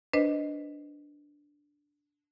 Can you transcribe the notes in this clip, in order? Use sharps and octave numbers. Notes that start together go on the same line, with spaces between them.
D4 B4 C5 D#5